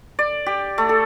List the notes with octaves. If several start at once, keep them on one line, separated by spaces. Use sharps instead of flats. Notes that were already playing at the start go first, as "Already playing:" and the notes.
D5
G4
A3
A4